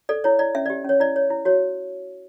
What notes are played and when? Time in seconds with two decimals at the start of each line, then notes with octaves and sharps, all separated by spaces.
0.09 A4 D5
0.24 E4 C#5
0.39 E4 D5
0.55 C#4 E5
0.66 G4 D5
0.85 C#4 C#5
1.00 E4 D5
1.16 C#5
1.30 E4
1.45 F#4 C#5